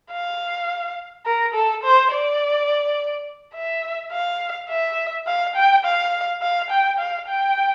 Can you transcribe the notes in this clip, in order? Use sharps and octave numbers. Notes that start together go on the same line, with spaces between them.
F5
A#4
A4
C5
D5
E5
F5
E5
F5
G5
F5
F5
G5
F5
G5